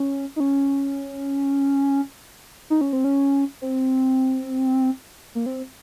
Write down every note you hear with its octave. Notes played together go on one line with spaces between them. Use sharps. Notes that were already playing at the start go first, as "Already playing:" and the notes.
Already playing: C#4
D#4
C#4
D#4
C#4
C4
C#4
C4
A#3
C4